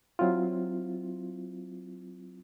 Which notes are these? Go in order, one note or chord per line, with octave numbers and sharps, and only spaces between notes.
F#3 C4 E4 F4